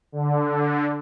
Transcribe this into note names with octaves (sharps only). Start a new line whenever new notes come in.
D3